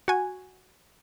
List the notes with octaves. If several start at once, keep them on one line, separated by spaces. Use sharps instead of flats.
F#4 G#5